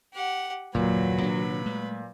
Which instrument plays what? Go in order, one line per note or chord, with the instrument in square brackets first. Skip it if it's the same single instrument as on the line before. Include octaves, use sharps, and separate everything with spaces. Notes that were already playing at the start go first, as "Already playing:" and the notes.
[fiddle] G4 F#5
[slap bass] F#1 D#2 [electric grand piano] A#2 [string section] F#3 [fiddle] B4
[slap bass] C3 D#3 D4
G#3 A3